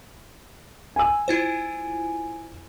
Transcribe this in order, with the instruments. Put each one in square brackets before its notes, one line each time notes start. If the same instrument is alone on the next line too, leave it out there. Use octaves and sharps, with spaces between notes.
[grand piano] G#5 E6
[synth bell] E4 F4 C5